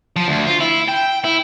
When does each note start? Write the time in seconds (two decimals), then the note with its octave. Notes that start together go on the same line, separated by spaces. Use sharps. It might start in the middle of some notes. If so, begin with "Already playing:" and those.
0.16 F3
0.28 D2
0.47 F4
0.60 E4
0.88 G5
1.24 E4